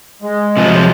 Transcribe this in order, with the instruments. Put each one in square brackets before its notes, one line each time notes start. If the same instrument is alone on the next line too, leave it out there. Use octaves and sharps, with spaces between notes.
[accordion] G#3
[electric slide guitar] C3 F3 F#3